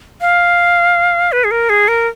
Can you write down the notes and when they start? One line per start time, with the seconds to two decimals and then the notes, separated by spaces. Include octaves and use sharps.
0.21 F5
1.32 B4
1.44 G#4
1.51 A#4
1.69 G#4
1.88 A#4